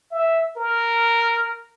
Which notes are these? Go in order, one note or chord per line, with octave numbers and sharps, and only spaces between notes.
E5
A#4